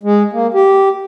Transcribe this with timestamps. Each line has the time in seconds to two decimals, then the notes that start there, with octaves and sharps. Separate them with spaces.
0.03 G#3
0.33 A#3
0.54 G4